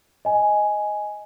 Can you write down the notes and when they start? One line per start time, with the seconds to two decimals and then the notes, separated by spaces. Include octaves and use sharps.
0.25 D#5 G#5